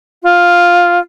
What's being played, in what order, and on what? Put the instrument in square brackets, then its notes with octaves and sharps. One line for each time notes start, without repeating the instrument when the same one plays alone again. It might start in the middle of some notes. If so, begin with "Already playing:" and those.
[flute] F4